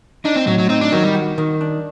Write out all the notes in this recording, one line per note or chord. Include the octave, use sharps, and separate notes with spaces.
D4 D#4
C4
A2 F#3
F#3
C4 D#4
D4
D#3 F#3
G3
F#4
D#3
D4